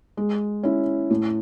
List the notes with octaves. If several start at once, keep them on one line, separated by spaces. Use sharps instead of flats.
G#3
C#4 E4
A2